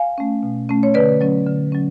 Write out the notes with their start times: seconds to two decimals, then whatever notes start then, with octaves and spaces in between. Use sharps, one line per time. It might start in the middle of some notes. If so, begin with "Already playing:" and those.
Already playing: F5 G#5
0.18 A3 C#4
0.43 B2
0.69 A3 C#4
0.83 C#5
0.94 D3 B4 D5
1.21 F#3 C#4
1.47 D3
1.72 F#3 C#4